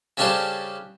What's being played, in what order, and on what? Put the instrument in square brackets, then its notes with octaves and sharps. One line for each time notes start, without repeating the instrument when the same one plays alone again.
[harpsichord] C#3 G3 C#4 D4 A4 C5